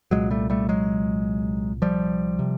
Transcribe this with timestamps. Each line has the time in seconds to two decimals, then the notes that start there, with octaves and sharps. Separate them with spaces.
0.11 C2 A#2 F#3 G#3
0.31 G3 A3
0.50 G3 A3
0.69 F#3 G#3
1.82 F3 G3
2.39 C3